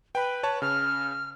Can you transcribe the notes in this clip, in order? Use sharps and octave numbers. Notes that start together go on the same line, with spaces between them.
B4 G5 B5
C#5 A5
C#3 F6